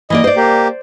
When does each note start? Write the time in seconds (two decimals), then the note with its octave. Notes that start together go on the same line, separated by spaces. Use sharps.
0.10 E3 A#3 D5 D#5
0.24 C5 D5
0.36 A#3 G4